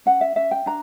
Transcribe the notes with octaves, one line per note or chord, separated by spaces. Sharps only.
C#4 F#5
E5
C#4 E5
G5
D4 A#5